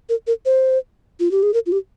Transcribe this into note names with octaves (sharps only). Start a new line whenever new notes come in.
A#4
A#4
C5
F4
G4
G#4
A#4
F4
G4